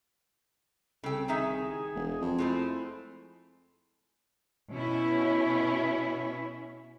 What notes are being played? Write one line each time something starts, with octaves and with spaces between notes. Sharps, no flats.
C2 C#3 A4 G5
D#3 D#4 G#4 E5
E1
F2
G#3 A3 C4 E4
B2 C#4 E4